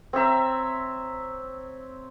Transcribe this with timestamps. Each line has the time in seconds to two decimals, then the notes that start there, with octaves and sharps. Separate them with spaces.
0.13 C4 C#5 E5 A#5